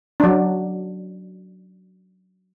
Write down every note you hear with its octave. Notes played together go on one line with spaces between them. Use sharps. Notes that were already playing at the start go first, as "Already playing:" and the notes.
F#3 D4